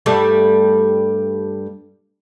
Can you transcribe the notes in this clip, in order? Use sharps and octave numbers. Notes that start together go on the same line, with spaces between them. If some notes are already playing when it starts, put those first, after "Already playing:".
G2 G3 A3